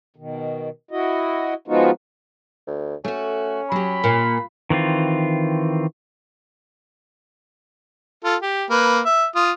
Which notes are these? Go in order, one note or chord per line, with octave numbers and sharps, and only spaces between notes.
B2 D#3
E4 F#4 D#5
F3 G#3 B3 D#4 F4 F#4
D2
A3 C#4 F#4
F#3 G4 B5
A#2 A#3
D#3 E3 C4 F4
F4 A4
G4
A#3 B4
E5
F4 D#6